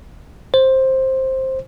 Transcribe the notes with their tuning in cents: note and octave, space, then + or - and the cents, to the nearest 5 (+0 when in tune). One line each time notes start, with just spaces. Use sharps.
C5 +10